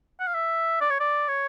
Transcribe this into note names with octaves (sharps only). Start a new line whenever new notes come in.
F#5
F5
E5
D5
C#5
D5
C#5